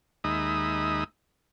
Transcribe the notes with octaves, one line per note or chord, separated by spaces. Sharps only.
D#2 G#3 D#4 E5 B5 D#6